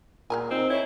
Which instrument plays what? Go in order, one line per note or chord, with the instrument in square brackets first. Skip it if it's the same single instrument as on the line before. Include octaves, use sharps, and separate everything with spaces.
[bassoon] A#2 [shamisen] G#3 A#4 G#5
[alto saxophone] C4 [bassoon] D#4
[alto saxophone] E4 [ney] C#5